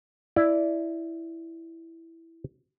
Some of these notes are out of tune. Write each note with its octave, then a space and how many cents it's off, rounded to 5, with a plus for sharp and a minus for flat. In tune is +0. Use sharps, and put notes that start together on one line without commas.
E4 +0 D5 +0